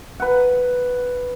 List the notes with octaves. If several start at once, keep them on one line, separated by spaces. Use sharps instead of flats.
B4 F#5